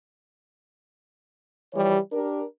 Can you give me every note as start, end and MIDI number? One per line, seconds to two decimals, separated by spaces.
1.74 1.98 52
1.74 1.98 53
1.74 1.98 55
1.74 1.98 67
1.74 1.98 73
2.13 2.43 62
2.13 2.43 67
2.13 2.43 70